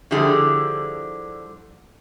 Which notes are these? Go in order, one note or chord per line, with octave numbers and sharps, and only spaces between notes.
D3 F3 G3 E4 G4 G#4